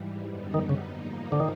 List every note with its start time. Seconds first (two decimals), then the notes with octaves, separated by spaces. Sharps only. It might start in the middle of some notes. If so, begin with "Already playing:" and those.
Already playing: G#2 E3 G3
0.26 F#2 D3 G3 B3 D#4
0.54 D#3
0.69 C#3
0.83 G#2 F3 A#3 D#4
1.32 D3
1.40 D#3